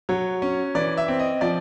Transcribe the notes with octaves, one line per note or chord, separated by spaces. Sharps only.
F#3 C#5
C#4
E3 D5
E5
C4
D#5
F3 D5